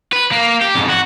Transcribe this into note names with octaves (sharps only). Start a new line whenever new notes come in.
B4
A#3
G4
F2 G#2
F#4